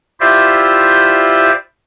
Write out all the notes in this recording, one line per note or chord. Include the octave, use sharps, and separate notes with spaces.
E4 F4 G4 C5 D5 E5